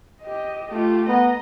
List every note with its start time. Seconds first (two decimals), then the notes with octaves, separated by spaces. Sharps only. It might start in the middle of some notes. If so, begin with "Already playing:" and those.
0.22 G4 D#5
0.70 A3 F4 G4
1.08 B3 D#5 A#5